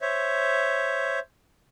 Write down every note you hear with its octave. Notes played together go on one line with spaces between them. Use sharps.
C5 C#5 E5